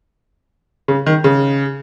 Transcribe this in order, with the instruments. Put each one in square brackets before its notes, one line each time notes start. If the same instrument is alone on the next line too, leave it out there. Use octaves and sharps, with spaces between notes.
[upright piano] C#3
D#3
C#3